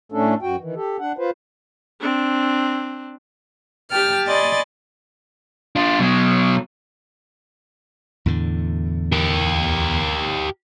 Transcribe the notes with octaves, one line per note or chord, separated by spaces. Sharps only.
A2 A3 C#4 D4 A4
F#2 F#4 G5
D#3 E3
G4 A4
D4 F#5
F4 B4 C5
C4 D4
G4 G5 A5 F6
D5 D#5 G#5 B5 C6 A6
D4 F4
B2 F#3
E2 A2 D3
G4 A#4